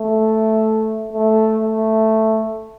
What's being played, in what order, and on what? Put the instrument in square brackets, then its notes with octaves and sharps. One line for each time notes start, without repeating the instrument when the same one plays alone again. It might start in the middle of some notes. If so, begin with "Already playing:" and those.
Already playing: [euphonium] A3
A3
A3